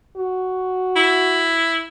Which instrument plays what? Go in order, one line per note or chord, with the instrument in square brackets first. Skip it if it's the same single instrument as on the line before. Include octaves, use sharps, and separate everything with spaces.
[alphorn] F#4
[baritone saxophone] E4